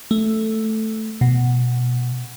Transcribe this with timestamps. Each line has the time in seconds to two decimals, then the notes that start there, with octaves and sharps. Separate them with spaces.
0.11 A3
1.21 B2